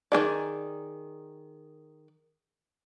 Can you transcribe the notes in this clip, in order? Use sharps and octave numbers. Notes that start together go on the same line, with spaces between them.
D#3 C#4 G#4 D5